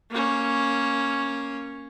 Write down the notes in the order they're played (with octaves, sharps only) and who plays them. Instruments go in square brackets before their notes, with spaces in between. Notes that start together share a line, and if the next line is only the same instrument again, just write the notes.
[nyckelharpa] A#3 C#4